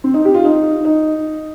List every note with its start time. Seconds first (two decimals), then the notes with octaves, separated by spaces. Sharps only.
0.04 C4
0.14 D#4
0.25 G4
0.34 F4
0.45 D#4
0.85 D#4